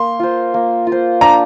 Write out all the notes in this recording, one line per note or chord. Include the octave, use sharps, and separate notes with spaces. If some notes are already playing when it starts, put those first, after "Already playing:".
Already playing: A#3 C6
F4 C5
A#3
F4
C5
D4 A#5